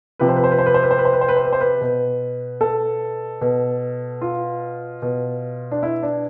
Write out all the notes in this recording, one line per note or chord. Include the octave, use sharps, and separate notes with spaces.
C3 F3 B4
C5
B4
C5
B4
C5
B4
C5
B4
C5
B4
C5
B4
C5
B4
C5
B4
C5
B4
B2
A4
B2
F4
B2
D4
E4
D4